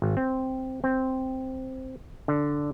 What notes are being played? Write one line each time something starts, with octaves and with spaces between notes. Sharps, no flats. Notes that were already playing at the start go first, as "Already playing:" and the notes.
G#1
C4
C4
D3